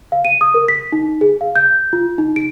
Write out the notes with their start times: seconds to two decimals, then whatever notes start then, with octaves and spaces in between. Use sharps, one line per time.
0.12 F5
0.25 D#7
0.41 D#6
0.54 A#4
0.68 B6
0.92 D#4
1.21 G#4
1.41 F5
1.56 G6
1.93 F4
2.18 D#4
2.36 D7